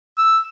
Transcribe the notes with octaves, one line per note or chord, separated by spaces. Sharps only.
E6